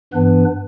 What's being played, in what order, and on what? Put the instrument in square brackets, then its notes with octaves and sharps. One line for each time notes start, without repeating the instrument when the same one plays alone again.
[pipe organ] G2 E3 B3 D4 B4